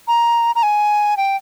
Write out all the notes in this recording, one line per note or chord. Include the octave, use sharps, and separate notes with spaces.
A#5
A#5
G#5
G5